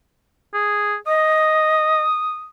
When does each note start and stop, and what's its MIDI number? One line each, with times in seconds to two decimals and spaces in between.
0.54 0.96 68
1.07 2.01 75
1.07 2.48 87